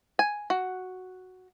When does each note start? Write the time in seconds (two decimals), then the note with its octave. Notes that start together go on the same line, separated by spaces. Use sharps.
0.19 G#5
0.50 F#4